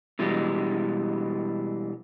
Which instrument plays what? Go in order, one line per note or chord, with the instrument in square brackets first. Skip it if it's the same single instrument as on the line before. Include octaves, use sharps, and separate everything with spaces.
[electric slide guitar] B2 E3 G3 G#3